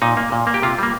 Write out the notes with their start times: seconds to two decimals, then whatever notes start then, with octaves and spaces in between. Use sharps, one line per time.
0.02 A#2 D#4
0.17 A#3
0.32 A#2
0.47 A#3
0.54 G4
0.62 C3 F4
0.79 G3 A#3